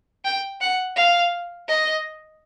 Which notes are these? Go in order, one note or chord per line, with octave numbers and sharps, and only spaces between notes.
G5
F#5
F5
D#5